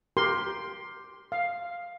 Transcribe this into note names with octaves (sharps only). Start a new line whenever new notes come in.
G4 A#4 C6
F5